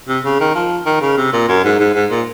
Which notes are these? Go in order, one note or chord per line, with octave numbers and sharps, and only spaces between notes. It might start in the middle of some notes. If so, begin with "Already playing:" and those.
C3
C#3
D#3
F3
D#3
C#3
C3
A#2
F#2
G#2
G#2
G#2
A#2